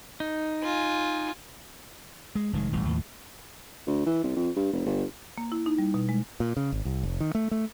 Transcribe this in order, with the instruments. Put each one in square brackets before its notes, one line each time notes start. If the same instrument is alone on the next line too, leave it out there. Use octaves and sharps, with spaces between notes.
[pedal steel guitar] D#4
[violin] F4 G#5
[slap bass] G#3
F1 D#3 G#3
E1 A1 A2 G3
D#2 A2 F3
[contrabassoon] D2
E3
C2
F2
G2
F1
G1
[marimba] A#3
E4
D#4
G3
B2
G#3
[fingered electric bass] A#2
C#3
G#1
C2
F1
D#3
A3
A3